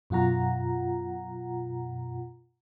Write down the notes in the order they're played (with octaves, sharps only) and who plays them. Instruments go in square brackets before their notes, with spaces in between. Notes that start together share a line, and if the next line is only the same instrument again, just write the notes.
[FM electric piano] F#2 B2 F4 F#5 A#5